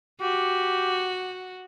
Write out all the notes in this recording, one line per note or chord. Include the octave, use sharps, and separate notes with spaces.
F#4 G4